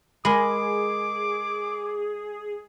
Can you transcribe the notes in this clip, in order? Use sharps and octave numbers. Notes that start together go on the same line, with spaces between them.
G#3 G#4 A#4 G#5 B5 D6